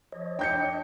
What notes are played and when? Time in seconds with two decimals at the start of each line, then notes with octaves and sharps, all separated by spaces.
0.12 F3 C#5 D#5
0.39 D4 G5 G6 C#7